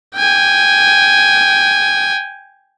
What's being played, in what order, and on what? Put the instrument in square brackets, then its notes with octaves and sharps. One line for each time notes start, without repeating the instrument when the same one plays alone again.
[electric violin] G5 G#5